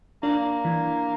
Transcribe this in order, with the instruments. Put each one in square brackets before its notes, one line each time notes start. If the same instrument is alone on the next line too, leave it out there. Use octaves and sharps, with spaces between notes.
[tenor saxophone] A#3 [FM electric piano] D4
[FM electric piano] E3